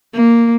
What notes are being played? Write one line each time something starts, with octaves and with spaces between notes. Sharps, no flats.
A#3